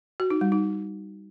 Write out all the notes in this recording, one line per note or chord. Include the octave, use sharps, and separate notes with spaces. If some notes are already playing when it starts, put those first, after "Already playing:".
F#4
D#4
G3
D#4